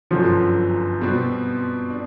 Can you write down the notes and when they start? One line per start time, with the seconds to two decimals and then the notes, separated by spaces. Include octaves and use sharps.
0.11 G1 F#2 D3 F3 F#3
1.01 B2 G3 C4
1.90 D4